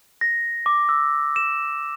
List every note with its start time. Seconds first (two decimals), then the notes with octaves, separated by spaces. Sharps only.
0.21 A#6
0.66 D6
0.89 E6
1.36 E7